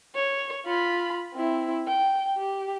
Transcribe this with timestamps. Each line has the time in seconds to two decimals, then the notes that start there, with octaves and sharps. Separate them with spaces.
0.15 C#5
0.66 F4 B5
1.33 C4 E4
1.88 G5
2.38 G4